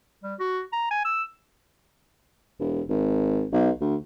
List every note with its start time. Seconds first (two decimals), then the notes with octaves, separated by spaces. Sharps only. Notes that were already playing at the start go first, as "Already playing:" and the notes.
0.24 G3
0.39 F#4
0.73 A#5
0.91 G#5
1.05 E6
2.59 E1
2.89 G#1
3.53 B1
3.80 D2